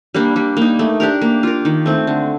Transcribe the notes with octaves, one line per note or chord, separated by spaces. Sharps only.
G3 A#3 D4
G3
A#3 D#4
A3
D4 G4 A#4
A#3
F4 A#4
D#3
A3 C4
D3